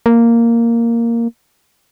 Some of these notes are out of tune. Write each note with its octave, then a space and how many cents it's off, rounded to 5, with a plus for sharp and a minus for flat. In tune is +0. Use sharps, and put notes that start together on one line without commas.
A#3 -5